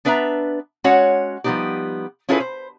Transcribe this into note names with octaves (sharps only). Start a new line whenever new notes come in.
B3 D4 B4 E5 F5 A#5
G#3 C#4 F#4 C#5 F#5
F3 G3 B3 C4 D#4 G4
C#4 E4 F4 G#4 A4 B4
C5